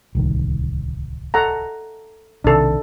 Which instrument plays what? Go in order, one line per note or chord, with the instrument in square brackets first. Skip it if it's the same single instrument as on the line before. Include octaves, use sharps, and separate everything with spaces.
[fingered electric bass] D1 C2 D#3
[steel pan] A4 F#5 A#5
[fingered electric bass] B1 C3 D#3 [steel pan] D4 A4